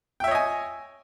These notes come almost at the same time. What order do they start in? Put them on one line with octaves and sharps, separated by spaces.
G5 E5 C#5 D#5 G#5